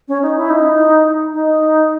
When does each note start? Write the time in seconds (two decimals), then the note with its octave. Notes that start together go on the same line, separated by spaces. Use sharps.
0.08 C#4
0.23 D#4
0.37 E4
0.50 D#4
1.33 D#4